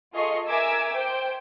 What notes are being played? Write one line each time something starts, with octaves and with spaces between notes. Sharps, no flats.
F4 G#4 A4 D#5 C#6 C7
A#4 E5 G#5 D6 E6 G#6
C5 G5